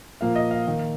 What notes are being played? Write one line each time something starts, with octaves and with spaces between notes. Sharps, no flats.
A#2 F3 A#3 F5
D#5
F5
D#3 A#3